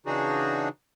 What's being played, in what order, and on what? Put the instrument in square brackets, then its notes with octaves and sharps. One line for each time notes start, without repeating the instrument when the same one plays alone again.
[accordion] C#3 E3 D4 D#4 F#4 G#4